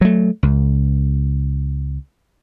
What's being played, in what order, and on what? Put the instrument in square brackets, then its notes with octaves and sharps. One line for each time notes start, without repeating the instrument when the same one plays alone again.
[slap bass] F#3 A3
C#2